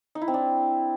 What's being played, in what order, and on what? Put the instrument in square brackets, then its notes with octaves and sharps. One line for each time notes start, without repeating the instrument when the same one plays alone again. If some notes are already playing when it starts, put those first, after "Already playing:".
[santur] D#4
E4
C4
D4